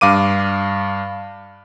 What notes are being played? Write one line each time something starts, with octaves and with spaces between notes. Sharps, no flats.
G2 F5 D6 D#7